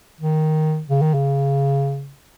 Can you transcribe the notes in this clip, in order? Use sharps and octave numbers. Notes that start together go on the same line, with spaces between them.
D#3
C#3
D#3
C#3